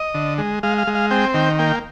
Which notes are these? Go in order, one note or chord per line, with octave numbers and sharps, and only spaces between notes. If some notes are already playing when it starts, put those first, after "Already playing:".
Already playing: D#5
D3
G#3
G#3 F5
F5
G#3
F5
C4 G5
D#3 G5
A#3 G5